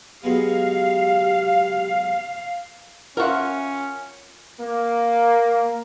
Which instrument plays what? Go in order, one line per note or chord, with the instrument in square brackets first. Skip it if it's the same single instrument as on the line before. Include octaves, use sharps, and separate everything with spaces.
[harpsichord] F#3 G#3 B3 [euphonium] G4 [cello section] F5
[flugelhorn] C#4 [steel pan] F4 F#5 C#6 [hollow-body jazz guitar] A#4 E5
[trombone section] A#3